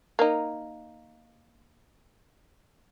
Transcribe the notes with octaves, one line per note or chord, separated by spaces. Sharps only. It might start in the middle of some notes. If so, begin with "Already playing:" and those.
A#3 D#4